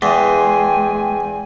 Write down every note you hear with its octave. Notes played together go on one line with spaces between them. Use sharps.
E2 G#3 G5 G#5